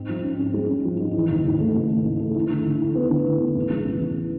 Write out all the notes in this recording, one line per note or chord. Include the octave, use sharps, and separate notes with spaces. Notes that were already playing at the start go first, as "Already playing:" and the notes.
Already playing: G#2 C4
F3
C#4
C#4
G#3
C#4
F3
G#2
E3
D#2
D#2
A3
C#3
A3
C#3
A3
E4
D3
D3
E4
B3
D3
D3
B3
A1
G#3
A1
A1